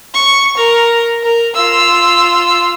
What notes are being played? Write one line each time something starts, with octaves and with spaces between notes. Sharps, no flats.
C#6
A#4
A#4
F4 E6